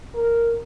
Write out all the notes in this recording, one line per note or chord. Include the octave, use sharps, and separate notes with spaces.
A#4